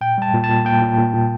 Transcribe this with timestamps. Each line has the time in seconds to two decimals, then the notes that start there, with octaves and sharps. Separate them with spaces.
0.01 A#2 G5
0.18 G3 A5
0.34 A#2
0.44 A5
0.49 A#2
0.65 A#3 G5
0.82 A#2
0.98 A#2
1.14 A#2